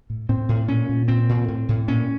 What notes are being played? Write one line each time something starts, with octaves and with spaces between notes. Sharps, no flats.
A2
A2 C4
A2
A#2 C#4
A#2
A#2 C4
A#2
A2
A2
A#2 C#4